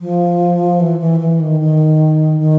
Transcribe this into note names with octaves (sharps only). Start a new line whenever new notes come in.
F3
E3
E3
E3
D#3
D#3
D#3